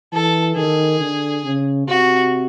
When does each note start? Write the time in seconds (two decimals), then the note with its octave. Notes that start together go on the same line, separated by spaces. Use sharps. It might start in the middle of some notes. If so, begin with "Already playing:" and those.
0.13 E3 A4
0.56 D#3 G#4
1.00 D3
1.44 C#3
1.87 C3 F#4